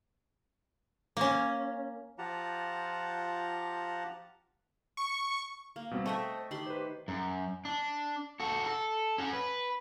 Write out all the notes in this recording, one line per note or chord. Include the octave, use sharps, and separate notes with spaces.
A#3 C#4
F3 F4 G4 F#5 A5 A#5
C#6
A#3
B2 G3 C4
A3 C5 D#5 E5 G5 A5 C#6
D#3 G4 B5 C6
B4 C5
F#2
D4
F#4 A4
A4
C#4 F#4
B4